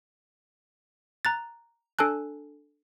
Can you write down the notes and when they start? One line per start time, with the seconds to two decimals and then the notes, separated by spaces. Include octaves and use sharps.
1.25 A#5 F#6 A6
1.99 D4 A4 G#5 A5 F#6